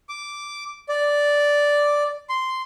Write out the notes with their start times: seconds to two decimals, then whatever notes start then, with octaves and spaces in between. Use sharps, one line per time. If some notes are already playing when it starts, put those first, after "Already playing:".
0.09 D6
0.89 D5
2.29 C6